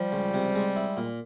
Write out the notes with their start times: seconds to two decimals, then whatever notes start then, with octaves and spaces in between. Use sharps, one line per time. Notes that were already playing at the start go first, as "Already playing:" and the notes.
Already playing: F3 G3
0.12 C#2
0.34 C3
0.55 G#3
0.76 E4
0.97 A#2